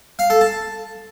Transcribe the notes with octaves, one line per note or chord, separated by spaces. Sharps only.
F5
A4
A5